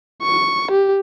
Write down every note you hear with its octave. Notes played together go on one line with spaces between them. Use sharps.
C#6
G4